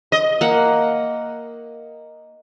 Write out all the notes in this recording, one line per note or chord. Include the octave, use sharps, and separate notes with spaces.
D#5
A#3 F#5